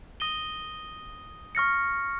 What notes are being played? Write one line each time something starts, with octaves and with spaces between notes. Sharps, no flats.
D#6 A#6 D#7 G7
C#6 F6 A#6 C#7